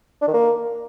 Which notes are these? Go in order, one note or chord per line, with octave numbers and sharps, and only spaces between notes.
D4
D#3
A#3